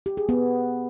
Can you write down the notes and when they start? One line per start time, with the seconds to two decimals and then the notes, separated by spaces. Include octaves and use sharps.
0.06 G4
0.17 G#4
0.29 B3